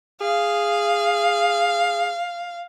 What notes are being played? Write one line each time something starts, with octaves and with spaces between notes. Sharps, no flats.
G#4 F5